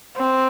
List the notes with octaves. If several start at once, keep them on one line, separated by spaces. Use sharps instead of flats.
C4